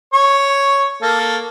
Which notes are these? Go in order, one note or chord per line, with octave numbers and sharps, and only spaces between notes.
C#5
A#3 A4